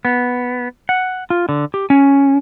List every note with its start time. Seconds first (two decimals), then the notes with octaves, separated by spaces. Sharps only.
0.05 B3
0.89 F#5
1.30 F4
1.49 D3
1.74 G4
1.90 C#4